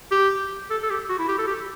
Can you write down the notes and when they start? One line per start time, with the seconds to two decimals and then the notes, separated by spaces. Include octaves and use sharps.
0.12 G4
0.70 A4
0.83 A4
0.90 G4
1.09 F#4
1.19 E4
1.28 G4
1.39 A4
1.47 G4